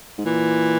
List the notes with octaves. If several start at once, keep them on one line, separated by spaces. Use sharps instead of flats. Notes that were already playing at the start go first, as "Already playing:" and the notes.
G#2
A#2 E3